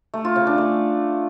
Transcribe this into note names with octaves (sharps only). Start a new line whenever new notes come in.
A3
F4
C#3
D4
A3